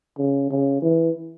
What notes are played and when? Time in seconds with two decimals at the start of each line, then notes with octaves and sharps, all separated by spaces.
0.18 C#3
0.50 C#3
0.82 E3